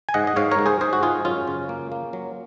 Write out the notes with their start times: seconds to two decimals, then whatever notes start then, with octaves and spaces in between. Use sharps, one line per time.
0.09 G#5
0.14 G#2 D#5 F#5
0.27 D#5
0.36 G#2 C#5 F5
0.51 A#4 C#5
0.59 G#2
0.66 G#4 C5
0.81 G#2 G#4 C5
0.93 F#4
1.03 G#2 F4 G#4
1.25 F#2 C#4 F4
1.48 C#3
1.69 A#3
1.92 A#3
2.13 F#3